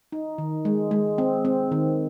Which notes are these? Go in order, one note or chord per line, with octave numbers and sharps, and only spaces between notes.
D#4
D#3
G#3
G#3
C4
C4
D#3